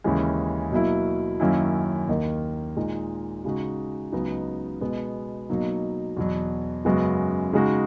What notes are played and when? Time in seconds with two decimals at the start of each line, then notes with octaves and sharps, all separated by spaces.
0.04 D#2 C#3 E3 G#3 C#4
0.72 B2 F#3 A#3 E4
1.40 F#2 D#3 A#3 C#4 E4
2.08 D#2 D#3 A#3
2.77 A#2 G#3 D#4
3.45 C#3 G#3 D#4 F#4
4.12 C#2 C#3 F#3 B3 D#4
4.81 B2 G#3 B3
5.50 B2 F#3 A#3 D#4
6.17 E2 B2 F#3
6.85 F#2 C#3 G#3 B3 F#4
7.53 C#3 G#3 D#4 F#4